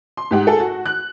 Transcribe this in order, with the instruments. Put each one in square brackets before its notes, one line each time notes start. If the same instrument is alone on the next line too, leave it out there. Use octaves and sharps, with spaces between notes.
[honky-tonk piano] C6
G#2 G4 F#5
G#4 A4
F#4
F#6